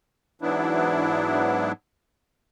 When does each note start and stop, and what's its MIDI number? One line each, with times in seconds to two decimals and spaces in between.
0.42 1.72 44
0.42 1.72 52
0.42 1.72 54
0.42 1.72 59
0.42 1.72 62
0.42 1.72 64